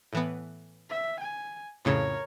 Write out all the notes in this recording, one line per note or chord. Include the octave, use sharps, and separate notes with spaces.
A2 E3 B3
E5
G#5
F2 A2 C#3 A#4 C#5